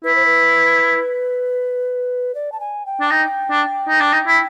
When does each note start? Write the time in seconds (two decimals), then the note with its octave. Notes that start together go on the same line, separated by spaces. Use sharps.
0.04 E4 B4
0.15 C5
0.26 B4
2.35 D5
2.52 A5
2.60 G#5
2.86 G5
3.01 D4
3.11 D#4 G5
3.50 D4
3.88 D#4
4.01 D4
4.13 D#4
4.27 E4